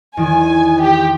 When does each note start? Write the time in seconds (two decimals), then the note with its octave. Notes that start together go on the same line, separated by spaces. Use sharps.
0.17 E2 D#3 G#5
0.81 G4